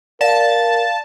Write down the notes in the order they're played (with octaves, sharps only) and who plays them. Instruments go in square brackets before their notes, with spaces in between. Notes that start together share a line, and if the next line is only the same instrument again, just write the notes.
[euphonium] A#4 [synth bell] D5 [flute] F5 [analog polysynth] A5